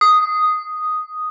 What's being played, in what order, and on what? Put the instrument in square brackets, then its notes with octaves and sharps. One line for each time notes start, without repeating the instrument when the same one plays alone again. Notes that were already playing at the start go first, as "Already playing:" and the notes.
[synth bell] D#6